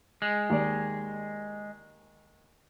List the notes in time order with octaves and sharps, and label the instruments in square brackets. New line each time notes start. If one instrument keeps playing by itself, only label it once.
[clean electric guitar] G#3
[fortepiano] D#2 D5